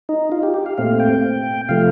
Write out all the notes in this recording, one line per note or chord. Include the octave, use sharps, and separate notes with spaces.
D#4
F4
G4
G4
F5
A#2 A3 C4 F5
G5
C3 F3 A3 F5